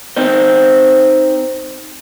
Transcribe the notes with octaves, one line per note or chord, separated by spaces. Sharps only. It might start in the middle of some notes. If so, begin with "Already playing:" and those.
C4 D#4 C5